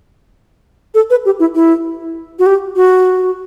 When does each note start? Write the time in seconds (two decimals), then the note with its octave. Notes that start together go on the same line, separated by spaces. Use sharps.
0.95 A4
1.10 B4
1.25 G4
1.40 E4
1.55 E4
2.39 F#4
2.46 G4
2.76 F#4